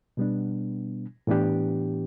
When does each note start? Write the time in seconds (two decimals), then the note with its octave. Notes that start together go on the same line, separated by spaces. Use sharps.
0.17 B2 G3 B3 D4
1.27 A2 E3 B3 D4 G4